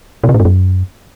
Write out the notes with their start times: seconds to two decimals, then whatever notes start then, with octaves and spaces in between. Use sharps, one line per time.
0.24 B2
0.29 C3
0.34 A2
0.40 G2
0.45 F#2